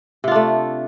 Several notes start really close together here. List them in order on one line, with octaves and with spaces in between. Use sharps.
C3 F4 D4 A3